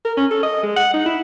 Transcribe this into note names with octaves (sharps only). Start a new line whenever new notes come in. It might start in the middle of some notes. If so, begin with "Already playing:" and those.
A#4
C#4
A4
D#5
G#3
F#5
D#4
E4